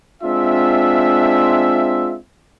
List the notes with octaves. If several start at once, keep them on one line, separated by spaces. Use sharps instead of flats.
G#3 C4 D4 F4 E5